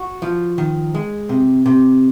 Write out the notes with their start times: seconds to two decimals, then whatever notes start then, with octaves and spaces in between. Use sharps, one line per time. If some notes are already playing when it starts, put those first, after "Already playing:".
Already playing: F#4
0.22 F3
0.58 D#3
0.94 G#3
1.29 C3
1.66 C3